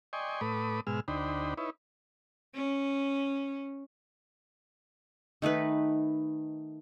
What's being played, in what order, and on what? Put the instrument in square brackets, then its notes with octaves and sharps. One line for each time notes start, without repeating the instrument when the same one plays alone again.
[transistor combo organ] D5 D#5 G5 G#5 C6 C#6
A2 A3 B4 B5 D6 D#6
G#2 B2 G#3 E6 F6
D2 D4 D#4 C5 G5 B5
D#4 E4 B4 C#5
[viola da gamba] C#4
[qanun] D#3 A3 D#4 B4